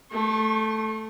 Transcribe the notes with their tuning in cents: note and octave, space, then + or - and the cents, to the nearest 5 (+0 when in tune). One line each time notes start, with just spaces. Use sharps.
A3 +0 C#6 -45